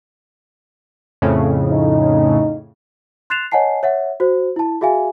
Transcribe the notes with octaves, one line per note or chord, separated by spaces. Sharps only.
F2 A2 C#3
D#4
C6 F#6 A6 C7 E7 F7
C#5 D#5 F#5 G#5 A5 C7
C#5 E5 F#5
F#4 C5
E4 A5
F#4 G#4 E5 F5 G#5